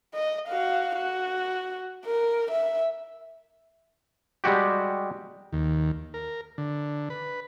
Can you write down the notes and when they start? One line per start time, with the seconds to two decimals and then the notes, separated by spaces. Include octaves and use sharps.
0.15 D#5
0.48 F#4 F5
0.96 F#4
2.05 A#4
2.51 E5
4.44 G3 G#3 F#4 G4
5.53 D#2
6.14 A#4
6.58 D3
7.10 B4